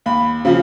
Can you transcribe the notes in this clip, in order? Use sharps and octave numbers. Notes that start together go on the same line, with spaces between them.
D#2 B5
C#3 F3